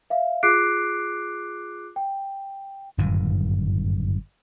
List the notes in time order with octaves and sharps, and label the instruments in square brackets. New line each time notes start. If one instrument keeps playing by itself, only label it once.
[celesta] E5 F5
F4 G#4 D6 F#6 C7 D7
G5
[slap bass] G1 F#2 A2 D#3